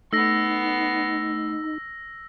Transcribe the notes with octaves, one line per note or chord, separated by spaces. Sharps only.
A3 B3 D#4 E6 A#6 C7